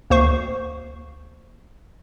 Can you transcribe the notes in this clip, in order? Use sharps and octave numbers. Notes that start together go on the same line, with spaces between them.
D2 A#3 C5 C#6 C7